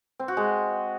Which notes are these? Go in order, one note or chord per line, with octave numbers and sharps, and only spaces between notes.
C4
F#4
G#3